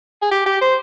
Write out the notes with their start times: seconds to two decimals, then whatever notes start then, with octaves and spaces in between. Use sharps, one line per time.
0.22 G#4
0.31 G4
0.46 G4
0.62 C5